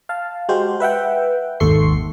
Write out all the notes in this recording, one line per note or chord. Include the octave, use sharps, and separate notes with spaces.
F5 A5
G#3 F#4 G4 C5
B4 E5 F#5 G5
G#1 D#2 A4 C6 C#6 C7